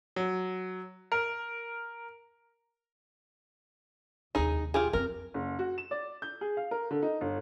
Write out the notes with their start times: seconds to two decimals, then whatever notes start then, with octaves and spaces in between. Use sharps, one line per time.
0.16 F#3
1.12 A#4
4.35 F1 D#2 D#4 G#4
4.74 F4 G4 G#4
4.93 F2 C4 A#4
5.34 F#1
5.59 F#4
5.78 E7
5.91 D5
6.22 G6
6.41 G#4
6.57 F5
6.71 A#4
6.91 D3
7.03 D#4
7.21 G1